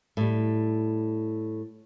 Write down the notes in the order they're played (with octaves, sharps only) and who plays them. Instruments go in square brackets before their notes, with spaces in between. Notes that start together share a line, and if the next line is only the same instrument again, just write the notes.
[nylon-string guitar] A2 G3